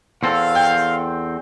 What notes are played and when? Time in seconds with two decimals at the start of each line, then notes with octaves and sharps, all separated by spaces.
0.23 E2 C4 A4 F5
0.55 G5